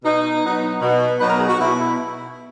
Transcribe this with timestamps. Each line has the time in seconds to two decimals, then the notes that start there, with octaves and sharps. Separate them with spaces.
0.04 B2 D#4
0.44 F#3 B3 D#4
0.82 B2
1.18 F#3 B3 D#4 B4
1.28 A#4
1.39 G#4
1.49 F#4
1.59 B2 E4
1.79 E4